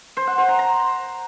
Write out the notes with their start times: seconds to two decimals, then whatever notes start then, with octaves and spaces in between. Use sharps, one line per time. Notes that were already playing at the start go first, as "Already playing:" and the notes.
0.17 C5
0.27 F#5
0.38 C5
0.48 A#5
0.59 A#5